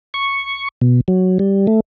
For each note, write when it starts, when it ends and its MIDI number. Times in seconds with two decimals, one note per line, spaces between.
0.14 0.68 85
0.81 1.01 47
1.08 1.38 54
1.39 1.67 55
1.67 1.80 57